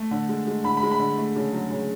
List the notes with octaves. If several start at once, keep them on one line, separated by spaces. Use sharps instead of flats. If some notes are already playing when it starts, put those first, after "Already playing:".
Already playing: A3
D3
G#3
G#3
D3 B5
B5
G#3
B5
D3
A3
C#3
F#3
C#3